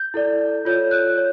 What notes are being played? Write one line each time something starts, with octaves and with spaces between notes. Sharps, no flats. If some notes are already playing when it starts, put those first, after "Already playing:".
Already playing: G6
E4 A4 D5
F4 A4 C#5 G6
F#6
C#5